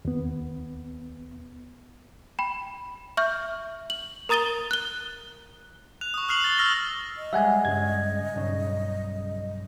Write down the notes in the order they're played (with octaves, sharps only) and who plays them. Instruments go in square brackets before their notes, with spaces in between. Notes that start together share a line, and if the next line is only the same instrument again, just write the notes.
[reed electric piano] D#2 B3
[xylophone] G5 B5
E5 C#6 F6 G6
F#7
A#4 A#5 D#6 A6 D#7 G7
F#6 G7
[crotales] F#6 F7
C#6 D#6
D#6 F6 F#6 C7 F7 F#7
A6 G7
C#6 E6 F6 A6 A#6
[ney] D#5
[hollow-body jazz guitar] G3 G#3 [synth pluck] E5 F#5 G#5
[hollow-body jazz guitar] G2 C#3 G#3 [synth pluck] G#6
[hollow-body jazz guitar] B1 G2 C#3